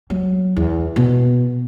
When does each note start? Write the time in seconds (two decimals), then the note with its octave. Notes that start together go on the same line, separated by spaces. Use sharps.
0.10 F#3
0.56 E2
0.96 B2